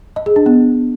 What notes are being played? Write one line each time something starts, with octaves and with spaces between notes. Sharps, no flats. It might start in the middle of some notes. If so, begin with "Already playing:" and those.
D#5
G#4
D4
B3